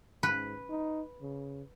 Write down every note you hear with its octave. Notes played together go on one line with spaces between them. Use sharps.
G#2 B4
D#4
C#3